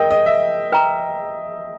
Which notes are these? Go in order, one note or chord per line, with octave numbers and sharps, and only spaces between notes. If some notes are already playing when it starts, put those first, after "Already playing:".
Already playing: A#4 D#5 G5
D#5
E5
B4 G5 A#5